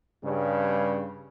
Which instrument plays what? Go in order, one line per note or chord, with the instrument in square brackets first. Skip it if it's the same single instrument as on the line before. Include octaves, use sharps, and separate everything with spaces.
[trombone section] G2 C#3